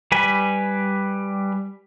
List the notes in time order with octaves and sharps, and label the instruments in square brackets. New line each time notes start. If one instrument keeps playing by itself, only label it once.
[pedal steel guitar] G3 B4 G#5 B5